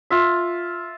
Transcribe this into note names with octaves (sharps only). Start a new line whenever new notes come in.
F4 E5